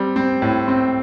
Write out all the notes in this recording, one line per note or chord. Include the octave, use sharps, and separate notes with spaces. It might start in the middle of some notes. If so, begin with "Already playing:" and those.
Already playing: G3 C4
C4
A2
C4